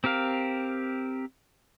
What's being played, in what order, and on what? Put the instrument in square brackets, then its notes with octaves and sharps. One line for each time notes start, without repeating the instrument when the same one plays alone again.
[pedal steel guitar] C4 G4 A#4 F5